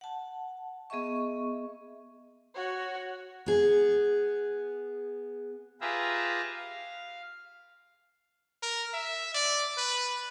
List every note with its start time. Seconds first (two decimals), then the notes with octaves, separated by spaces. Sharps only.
0.01 F#5 A5
0.90 B3 G#4 D#5 E5 C#6
2.55 F#4 C#5
3.46 B3 G#4
5.81 F4 G4 G#4 B4 E5 A#5
6.53 F5
8.63 A#4
8.94 E5
9.34 D5
9.77 B4